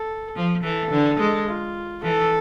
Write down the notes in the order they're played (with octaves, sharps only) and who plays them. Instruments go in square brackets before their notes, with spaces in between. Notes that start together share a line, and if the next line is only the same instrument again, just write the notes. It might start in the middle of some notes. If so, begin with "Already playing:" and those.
Already playing: [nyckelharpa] A4
[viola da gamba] F3
[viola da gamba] E3 [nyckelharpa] A4
[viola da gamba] D3
G#3
[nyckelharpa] F4
[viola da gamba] E3 [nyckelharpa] A4